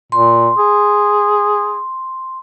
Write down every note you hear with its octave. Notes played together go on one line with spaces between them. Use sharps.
A#2 C6
G#4